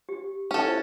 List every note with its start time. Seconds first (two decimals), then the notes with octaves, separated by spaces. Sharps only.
0.09 G4
0.51 C#4 A4
0.67 E4 C5 E5